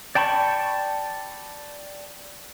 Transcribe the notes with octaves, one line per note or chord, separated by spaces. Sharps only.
D5 G5 A5 B5 C#6